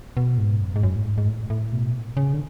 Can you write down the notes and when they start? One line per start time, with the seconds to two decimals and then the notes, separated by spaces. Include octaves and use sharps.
0.17 B2
0.38 G#2
0.61 F#2
0.76 G#2
0.83 F#2
0.96 A2
1.06 G#2
1.18 G#2
1.28 A2
1.50 A2
1.72 B2
2.17 C#3
2.33 D3